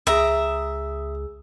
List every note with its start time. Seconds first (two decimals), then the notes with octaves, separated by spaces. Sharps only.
0.07 C#2 G#4 E5 A#5 E6